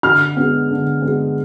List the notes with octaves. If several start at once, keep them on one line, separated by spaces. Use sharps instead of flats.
D3 F6
G#3 B3
D3
G#3 B3